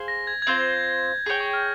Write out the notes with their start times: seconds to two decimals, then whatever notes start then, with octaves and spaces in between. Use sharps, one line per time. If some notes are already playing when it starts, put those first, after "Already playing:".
Already playing: G#4 C5 F5 G#5
0.08 A#6
0.27 G#6
0.42 G#6
0.47 C4 F4 C5 G6
1.26 G#4 C#5 G5 C#6
1.40 C#6
1.53 F6